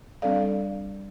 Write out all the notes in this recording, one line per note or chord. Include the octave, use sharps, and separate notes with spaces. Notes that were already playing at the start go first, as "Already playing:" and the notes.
G3 C4 D4 A4 D5 F5